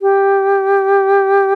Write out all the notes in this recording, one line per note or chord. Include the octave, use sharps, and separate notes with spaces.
G4